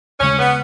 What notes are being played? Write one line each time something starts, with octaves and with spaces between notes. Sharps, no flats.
D#2 C#3 G#3 C#4
B3